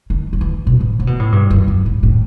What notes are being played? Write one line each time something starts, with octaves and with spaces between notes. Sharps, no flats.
D#3
F#3
E3
B2
A2
C3
B2
A2
G2
F#2
F#2
A2
A2